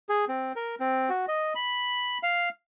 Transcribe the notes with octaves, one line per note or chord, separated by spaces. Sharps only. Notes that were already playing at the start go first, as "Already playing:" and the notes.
G#4
C4
A#4
C4
F#4
D#5
B5
F5